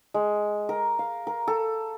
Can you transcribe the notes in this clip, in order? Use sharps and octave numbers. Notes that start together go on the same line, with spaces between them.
G#3
A#4
F5
A#4
A4